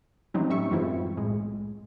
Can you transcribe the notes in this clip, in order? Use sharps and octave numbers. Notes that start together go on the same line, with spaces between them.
E3 F#3 G3 C4 C#4 D#4
A2 G3 E5 C#6 C#7
F#2 E3 G#3 C4 E4 F4
B1 A2 G#3